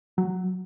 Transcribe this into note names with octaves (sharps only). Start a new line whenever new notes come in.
F#3